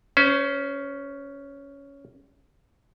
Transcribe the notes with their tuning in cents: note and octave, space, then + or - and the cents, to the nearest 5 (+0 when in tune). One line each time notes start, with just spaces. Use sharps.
C#4 +10 C5 -30